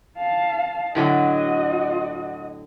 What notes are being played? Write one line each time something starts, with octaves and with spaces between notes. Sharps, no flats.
F5 A5
A2 D3 F#3 F#4 D#5